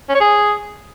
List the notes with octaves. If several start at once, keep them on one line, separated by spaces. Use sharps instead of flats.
C#4
C#5
G#4